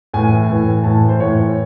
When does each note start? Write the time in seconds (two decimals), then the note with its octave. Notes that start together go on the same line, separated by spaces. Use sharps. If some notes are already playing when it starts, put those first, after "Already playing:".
0.14 A2 E3 G#5
0.50 A2 E3
0.84 A2 E3 A5
1.09 C5
1.20 A2 E3 C#5